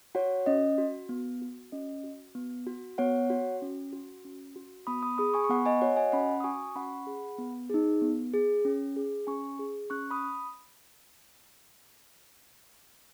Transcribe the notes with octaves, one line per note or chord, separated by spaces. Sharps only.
F#4 C#5 F#5
C#4 D#5
F#4
B3
F#4
C#4 D#5
F#4
B3
F#4
B3 C#5 F#5
F#4
C#4
F#4
C#4
F#4
B3 B5 D#6
B5 D#6
G#4 B5 D#6
G#5 C#6
C#6
B3 F#5 B5
D#5 G#5
F#4 C#5 F#5
D#5 G#5
C#4 F#5 B5
D#6
F#4 G#5 C#6
C#6
C#4 F#5 B5
G#4
B3
D#4 G#4
B3
G#4
C#4
G#4
C#4 G#5 C#6
G#4
C#4 C#6 F#6
B5 D#6